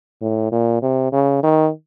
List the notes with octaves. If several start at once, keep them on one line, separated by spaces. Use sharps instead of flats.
A2
A#2
C3
C#3
D#3